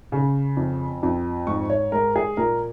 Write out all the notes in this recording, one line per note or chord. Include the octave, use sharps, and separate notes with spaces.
C#3
F2
F2
G#2 C#6
C#5
G#3 A#4
G#4
A#2 A#4